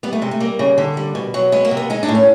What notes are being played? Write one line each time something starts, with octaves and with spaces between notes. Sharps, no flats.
G3 B3
A3
C3 G#3
A3
G3 A#3
C#3
D3
G3
B2
F#3
G#3 B3
A#3
C3
B3
G#3 D#4
D4
A2
C#4